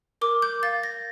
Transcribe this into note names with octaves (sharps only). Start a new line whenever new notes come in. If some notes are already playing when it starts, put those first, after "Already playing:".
A#4 D6
G6
F5 A6
A#6